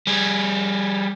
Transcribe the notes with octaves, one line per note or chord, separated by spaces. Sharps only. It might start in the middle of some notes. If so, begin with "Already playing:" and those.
G3 G#4